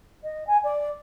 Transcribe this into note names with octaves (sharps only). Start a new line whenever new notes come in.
D#5
G#5
D5